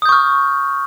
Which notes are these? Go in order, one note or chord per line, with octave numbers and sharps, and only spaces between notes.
C#6 D#6 F6 G6